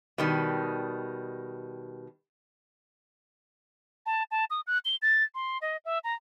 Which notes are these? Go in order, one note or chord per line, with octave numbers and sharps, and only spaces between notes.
B2 D#3 G3
A5
A5
D#6
F#6
G7
A6
C6
D#5
E5
A#5